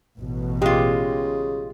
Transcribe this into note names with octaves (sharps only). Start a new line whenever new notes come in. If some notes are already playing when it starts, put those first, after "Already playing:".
A1 B2
C#3 G#3 F4 G4